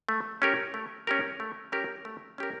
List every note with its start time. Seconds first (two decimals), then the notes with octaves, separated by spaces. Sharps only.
0.09 A3
0.42 C#4 G4 A#4
0.74 A3
1.07 C#4 G4 A#4
1.40 A3
1.72 C#4 G4 A#4
2.05 A3
2.38 C#4 G4 A#4